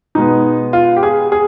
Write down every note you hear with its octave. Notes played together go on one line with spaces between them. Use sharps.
B2 G#3 B3 D#4
F4
G4
G#4
G#4